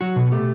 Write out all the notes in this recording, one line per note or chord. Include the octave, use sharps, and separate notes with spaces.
F#3 F#4
B2
A3 G4